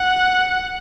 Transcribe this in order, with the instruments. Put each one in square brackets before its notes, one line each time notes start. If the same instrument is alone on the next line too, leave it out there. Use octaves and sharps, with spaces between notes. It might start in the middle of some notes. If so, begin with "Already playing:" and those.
Already playing: [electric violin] F#5